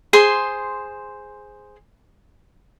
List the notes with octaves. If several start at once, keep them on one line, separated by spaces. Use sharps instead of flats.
G#4 C5 C6